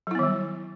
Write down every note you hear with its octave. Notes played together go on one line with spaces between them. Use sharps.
D#3 F#3 G3 B3 E4